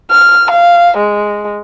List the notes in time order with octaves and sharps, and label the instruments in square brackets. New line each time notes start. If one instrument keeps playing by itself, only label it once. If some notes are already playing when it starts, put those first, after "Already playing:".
[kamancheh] F6
F5
G#3